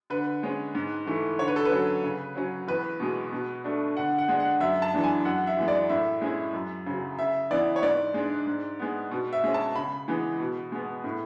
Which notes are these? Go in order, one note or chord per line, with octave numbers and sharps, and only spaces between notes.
D3 B4
G#3 C#4
G#2
E3 A3
D3 C#5
B4
A4
B4
F#3 C#4
C#3
F#3 C#4
E2 B4
B2 G#3
B2
A3 D4
D3 F#5
F#5
G#3 D4
F#5
F#2 E5
A5
E3 G#3 D4
G#5
F#2 F#5
E5
E3 G#3
D5
A2 E5
G#3 C#4 E4
F#2
C#3 F#3
C#3 E5
E3 B3 E4 D5
C#5
G#2 D5
G#3 D4
G#2
G#3 B3
B2
E5
G#3 C#4
A5
C#3 B5
E3 G#3 B3
B2
G#3 B3
A2